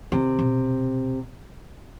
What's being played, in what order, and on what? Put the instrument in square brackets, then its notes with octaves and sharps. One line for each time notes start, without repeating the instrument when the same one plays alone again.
[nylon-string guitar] C3 [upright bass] D#3
[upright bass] B2